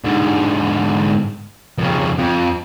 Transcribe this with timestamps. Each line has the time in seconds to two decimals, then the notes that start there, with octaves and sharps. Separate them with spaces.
0.04 G#2 D3
1.78 F2 C#3
2.18 F2